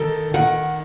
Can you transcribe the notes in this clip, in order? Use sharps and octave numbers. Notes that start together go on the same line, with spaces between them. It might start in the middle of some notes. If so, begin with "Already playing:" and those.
Already playing: D#3 A4
D#3 F#5